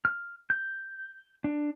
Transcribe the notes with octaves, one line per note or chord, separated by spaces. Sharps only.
F6
G6
D4